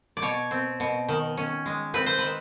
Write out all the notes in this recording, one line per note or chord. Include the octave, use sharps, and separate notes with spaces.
D5
B2 C#5
C4
B2
D#3
C#4
G#3
C4 B4
C5
D#3 B4